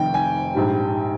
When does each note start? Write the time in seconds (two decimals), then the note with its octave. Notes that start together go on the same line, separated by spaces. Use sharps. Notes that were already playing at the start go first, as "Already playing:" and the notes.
Already playing: F1 F2 D#3 G5
0.14 G#5
0.54 A#1 G#2 G3